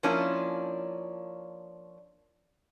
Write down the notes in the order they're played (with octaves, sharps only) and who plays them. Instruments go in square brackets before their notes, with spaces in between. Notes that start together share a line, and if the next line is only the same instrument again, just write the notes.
[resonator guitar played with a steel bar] F3 A#3 C#4 D4 E4